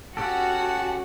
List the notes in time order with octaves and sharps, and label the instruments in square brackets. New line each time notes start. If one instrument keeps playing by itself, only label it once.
[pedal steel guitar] C#4 G4 A4 [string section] F#4 [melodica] F#5 A5